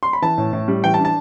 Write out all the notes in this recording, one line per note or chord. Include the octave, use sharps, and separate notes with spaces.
C6
B5
E3 A5
A2
A2
G3
E3 G5
A5
D4
A5